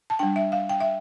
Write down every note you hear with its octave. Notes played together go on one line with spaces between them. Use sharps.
A5
G3 D4 G5
E5
F5
G5
E5